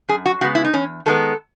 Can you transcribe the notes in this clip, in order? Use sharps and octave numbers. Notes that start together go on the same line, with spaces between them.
F#2 G#4
F#4
C#3 G#3 B3 F#4
E4
D#4
E2 C#4
D#3 G#3 B3 A4